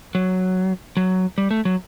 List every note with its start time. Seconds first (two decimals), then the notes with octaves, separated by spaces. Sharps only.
0.15 F#3
0.97 F#3
1.38 G3
1.51 A3
1.65 F#3